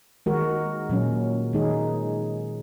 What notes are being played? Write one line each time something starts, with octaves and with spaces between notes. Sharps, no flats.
D#3 G#3 F#4 A#4
A#2 F#3 C#4
D#3 G#3 D#4 G#4